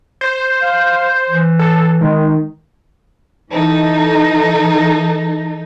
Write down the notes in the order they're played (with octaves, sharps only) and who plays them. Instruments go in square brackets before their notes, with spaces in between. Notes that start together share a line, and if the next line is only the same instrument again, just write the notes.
[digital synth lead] C5
[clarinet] F5
E3
[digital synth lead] A4
[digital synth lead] D#3 [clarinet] G#3
[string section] E3 D#4 A4